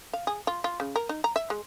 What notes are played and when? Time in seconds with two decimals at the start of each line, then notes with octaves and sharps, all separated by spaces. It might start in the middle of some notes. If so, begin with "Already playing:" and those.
0.13 F5
0.27 G#4
0.47 F4
0.64 F4
0.80 C#3
0.96 A#4
1.09 D#4
1.24 A#5
1.36 E5
1.50 G#3